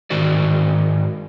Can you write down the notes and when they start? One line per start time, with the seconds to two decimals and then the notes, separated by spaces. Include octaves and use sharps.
0.10 G#2 D#3 F#4 D5